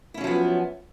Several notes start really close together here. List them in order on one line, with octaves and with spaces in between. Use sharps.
E4 C#4 F#3 F3 B3